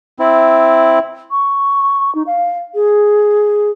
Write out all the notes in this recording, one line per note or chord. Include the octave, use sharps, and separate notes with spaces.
C4 E4
C#6
D#4
F5
G#4